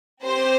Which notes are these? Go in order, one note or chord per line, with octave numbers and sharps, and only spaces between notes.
C4 G4 C5